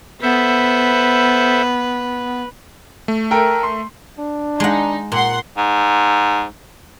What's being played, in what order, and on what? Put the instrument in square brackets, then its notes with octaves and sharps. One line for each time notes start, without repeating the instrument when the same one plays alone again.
[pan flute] B3 [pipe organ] A4 C5 E5 [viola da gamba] B4
[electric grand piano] A3
[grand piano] A4 A#4 G5
C6
[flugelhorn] D4
[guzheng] G#3 F#5 [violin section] D#4
[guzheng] A#2 [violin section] F#5 C6
[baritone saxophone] G#2